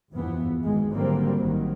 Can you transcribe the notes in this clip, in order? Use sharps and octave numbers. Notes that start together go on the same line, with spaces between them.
F#1 E2 G2 E3 F3 B3
G#1 G#2 G#3
D3 F#3 G3 A#3 C4
A#1 D#3 F#3